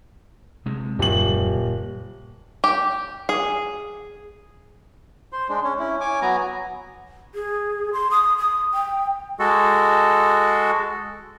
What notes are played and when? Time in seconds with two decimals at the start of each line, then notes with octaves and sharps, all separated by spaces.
0.66 C3 G#3
0.99 D#1 F#2 A#2 C#3 F#7
2.64 G4
3.29 G#4
5.33 C5 C6
5.49 G#3 D4
5.64 C#4 C#5
5.79 C#4 E4
6.01 C#5 G#5 D6
6.22 F#3 B3 G#5 A#5
7.35 G#4
7.93 C6
8.11 D#6
8.37 D#6
8.74 G5
9.39 G#3 F#4 A4